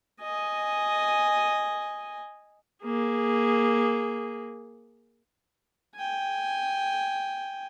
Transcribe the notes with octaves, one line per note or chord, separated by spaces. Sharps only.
D#5 G#5
A#3 G#4
G5 G#5